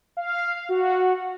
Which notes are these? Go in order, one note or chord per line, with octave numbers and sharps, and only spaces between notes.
F5
F#4